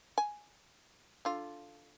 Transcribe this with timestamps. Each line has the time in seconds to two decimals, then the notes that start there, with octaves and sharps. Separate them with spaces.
0.18 G#5
1.25 D3 F4